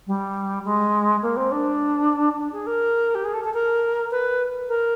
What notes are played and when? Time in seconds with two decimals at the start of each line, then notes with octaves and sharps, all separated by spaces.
0.07 G3
0.65 G#3
1.22 A#3
1.37 C4
1.52 D4
2.38 D4
2.52 G#4
2.67 A#4
3.15 G4
3.25 G#4
3.34 A4
3.44 A4
3.54 A#4
4.11 B4
4.69 A#4